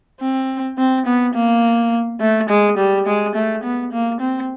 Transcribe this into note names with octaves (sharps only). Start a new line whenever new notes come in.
C4
C4
B3
A#3
A3
G#3
G3
G#3
A3
B3
A#3
C4